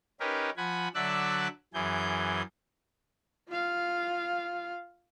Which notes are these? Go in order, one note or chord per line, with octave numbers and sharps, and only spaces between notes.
C#4 D#4 G4 A#4 B4
F3 F#5 G#5 B5
D3 F#3 D5 E5 E6 F#6
F#2 E3 G#4 G6
F4 F5